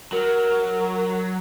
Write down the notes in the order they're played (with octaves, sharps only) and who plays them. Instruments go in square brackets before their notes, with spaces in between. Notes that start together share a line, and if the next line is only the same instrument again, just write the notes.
[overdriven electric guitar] F#3 [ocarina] A#4